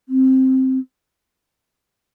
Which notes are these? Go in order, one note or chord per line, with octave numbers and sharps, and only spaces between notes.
C4